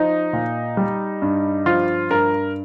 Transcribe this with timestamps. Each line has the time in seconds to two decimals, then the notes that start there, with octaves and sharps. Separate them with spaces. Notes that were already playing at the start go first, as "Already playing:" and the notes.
Already playing: F3 D#4
0.33 A#2
0.77 G3
1.22 G2
1.66 F3 F4
2.10 G2 A#4